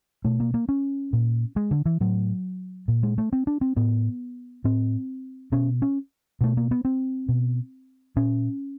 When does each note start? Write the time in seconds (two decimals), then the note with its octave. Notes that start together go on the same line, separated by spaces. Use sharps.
0.25 B2 A3
0.40 A#3
0.54 A#3
0.69 C#4
1.13 A#2
1.56 G#3
1.71 D3
1.86 E3
2.01 A2 F#3
2.88 A#2
3.03 G#3
3.18 A3
3.33 C4
3.47 D4
3.61 C4
3.76 A2 B3
4.64 A2 C4
5.52 B2 C#4
5.82 C#4
6.41 B2 A3
6.57 A#3
6.71 B3
6.85 C4
7.29 B2
8.16 A#2 C#4